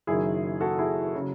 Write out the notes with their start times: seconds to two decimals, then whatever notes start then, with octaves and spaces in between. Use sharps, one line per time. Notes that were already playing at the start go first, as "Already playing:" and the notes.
0.07 F#1 F#2 D#3 E4 G#4
0.61 F#4 A4
0.79 E4 G#4
1.15 C#3 F#3